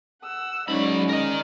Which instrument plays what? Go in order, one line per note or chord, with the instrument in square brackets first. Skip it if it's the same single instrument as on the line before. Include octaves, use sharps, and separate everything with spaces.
[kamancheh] F#5 E6
[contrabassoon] G#2 [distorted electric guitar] F#3 B5 [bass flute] C#4 [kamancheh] C#5 D5
[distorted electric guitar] A#4 D#5 [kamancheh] D5